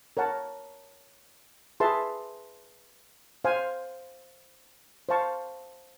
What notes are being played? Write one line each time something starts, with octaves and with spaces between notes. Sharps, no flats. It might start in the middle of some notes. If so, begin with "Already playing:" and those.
A#4 C#5 F#5 A5
G#4 B4 E5 A5 C6
C5 F5 G#5
C5 F5 A5 C#6